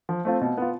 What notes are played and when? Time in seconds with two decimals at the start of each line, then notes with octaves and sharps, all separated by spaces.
0.09 F3
0.25 A3 C4 F4
0.41 B2
0.57 B3 F4